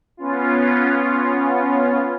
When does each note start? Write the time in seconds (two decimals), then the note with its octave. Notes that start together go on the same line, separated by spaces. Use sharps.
0.17 B3 C#4 F4